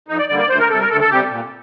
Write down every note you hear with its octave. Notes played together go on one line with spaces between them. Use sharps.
F2 D#4
D5
D3 G3 A#3 D5
D5
D2 C5
A#4
C3 G3 A4
A#4
D2 A4
A4
C3 G3 G4
A#2